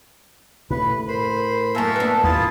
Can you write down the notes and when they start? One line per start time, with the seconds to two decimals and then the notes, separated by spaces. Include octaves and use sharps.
0.71 A2 B4 B5
1.08 A#4 C5 B5
1.75 F#2 A#3 A4 A#4 E5 G#5
1.96 B3 D4 B4
2.24 D#2 E4 F4 A5 D#6